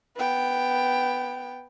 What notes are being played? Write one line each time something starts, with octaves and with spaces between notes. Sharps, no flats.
B3 G5